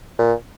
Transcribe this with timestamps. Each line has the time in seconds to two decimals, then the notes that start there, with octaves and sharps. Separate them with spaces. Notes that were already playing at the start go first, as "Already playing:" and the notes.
0.19 A#2